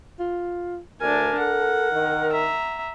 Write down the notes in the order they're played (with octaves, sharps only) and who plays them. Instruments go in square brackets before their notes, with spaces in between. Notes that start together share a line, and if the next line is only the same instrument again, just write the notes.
[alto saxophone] F4
[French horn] D2 [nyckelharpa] D4 G#5 [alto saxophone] A#4
[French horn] A4 [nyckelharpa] F#5
[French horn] D#3
[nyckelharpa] E5 A#5